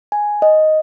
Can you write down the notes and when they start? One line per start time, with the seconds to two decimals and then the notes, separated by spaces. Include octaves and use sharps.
0.12 G#5
0.42 D#5